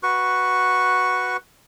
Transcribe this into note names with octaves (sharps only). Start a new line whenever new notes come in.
F#4 B4 C#6